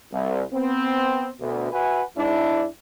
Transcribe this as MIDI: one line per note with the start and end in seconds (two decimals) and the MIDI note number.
0.12 0.42 36
0.52 1.29 59
0.52 1.29 60
1.40 1.72 38
1.40 1.72 47
1.72 2.02 66
1.72 2.02 71
1.72 2.02 76
1.72 2.02 78
1.72 2.02 80
2.16 2.64 44
2.16 2.64 62
2.16 2.64 64